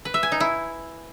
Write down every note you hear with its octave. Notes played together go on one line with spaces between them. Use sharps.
B4
E5
G#5
D#4
E4